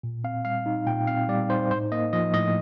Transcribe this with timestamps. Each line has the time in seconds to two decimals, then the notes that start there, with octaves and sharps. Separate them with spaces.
0.03 A#2
0.24 C4 F5
0.45 G3 F5
0.66 D#4
0.87 A#2 G5
1.07 C4 F5
1.28 G3 D5
1.49 D#4 C5
1.71 A2 C5
1.92 A#3 D#5
2.13 F3 D#5
2.34 A2 D#5